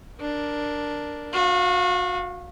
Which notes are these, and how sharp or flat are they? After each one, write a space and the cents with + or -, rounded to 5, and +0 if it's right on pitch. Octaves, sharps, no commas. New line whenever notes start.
D4 +0 A#4 +0
F#4 -30 F5 +0